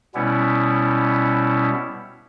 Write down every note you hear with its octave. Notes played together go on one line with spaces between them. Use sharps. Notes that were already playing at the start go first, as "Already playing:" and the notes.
B2 G3 B3 C#4 E4